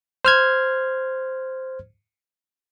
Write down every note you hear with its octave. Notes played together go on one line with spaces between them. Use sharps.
C5 F6 G#6